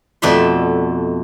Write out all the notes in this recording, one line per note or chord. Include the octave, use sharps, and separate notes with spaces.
F2 B2 A3 D5 E5 C6